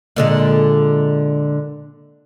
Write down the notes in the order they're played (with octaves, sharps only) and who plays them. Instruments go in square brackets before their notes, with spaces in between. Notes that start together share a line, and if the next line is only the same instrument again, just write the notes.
[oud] A#2 D3 G#3